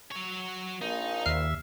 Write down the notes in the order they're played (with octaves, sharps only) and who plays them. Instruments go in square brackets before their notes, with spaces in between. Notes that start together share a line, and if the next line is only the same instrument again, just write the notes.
[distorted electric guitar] F#3 C#5
[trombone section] A#1 A#3 [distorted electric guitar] D#4
[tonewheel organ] D#2 E5 [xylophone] F6 C7